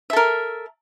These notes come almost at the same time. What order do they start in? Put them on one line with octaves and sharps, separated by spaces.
E5 A4 A#4